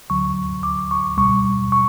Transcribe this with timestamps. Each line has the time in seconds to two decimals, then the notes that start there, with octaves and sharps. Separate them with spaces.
0.10 D2 D3 F#3 C#6
0.63 D6
0.91 C#6
1.17 C#2 B2 G3 C#6
1.72 C#6